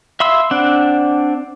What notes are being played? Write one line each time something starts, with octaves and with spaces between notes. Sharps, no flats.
E5 F5 B5 C6 E6
C4 D4 F#5